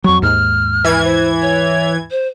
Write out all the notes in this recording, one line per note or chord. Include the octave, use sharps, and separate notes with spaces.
F2 F#3 C#6
D#2 G#2 F6
E3 G#6
C5
C#5
C5